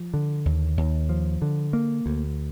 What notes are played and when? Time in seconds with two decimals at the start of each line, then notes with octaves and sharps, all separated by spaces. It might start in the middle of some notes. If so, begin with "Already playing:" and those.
Already playing: F3
0.14 D3
0.46 D#2
0.77 D#2
1.09 F3
1.42 D3
1.73 A#3
2.06 D2